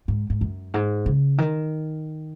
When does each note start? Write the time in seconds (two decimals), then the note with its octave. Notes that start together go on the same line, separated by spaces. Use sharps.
0.08 G#2
0.30 G#2
0.41 F#2
0.74 G#2
1.06 C#3
1.38 D#3